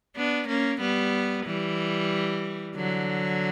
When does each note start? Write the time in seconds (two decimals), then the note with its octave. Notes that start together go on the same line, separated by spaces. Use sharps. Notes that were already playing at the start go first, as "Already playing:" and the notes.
0.16 B3 D4
0.48 A#3 C#4
0.81 G3 B3
1.46 E3 G3
2.76 D3 F#3